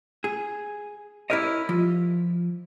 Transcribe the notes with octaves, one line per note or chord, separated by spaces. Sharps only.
G#4
E4 G4 A#4 C#5 D#5
F3